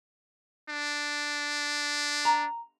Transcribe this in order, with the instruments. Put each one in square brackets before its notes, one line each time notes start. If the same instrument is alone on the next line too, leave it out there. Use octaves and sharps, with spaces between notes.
[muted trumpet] D4
[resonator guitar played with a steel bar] A#5